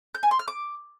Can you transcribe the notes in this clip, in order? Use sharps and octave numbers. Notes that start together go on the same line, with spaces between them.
G6
G#5
C6
F6
D6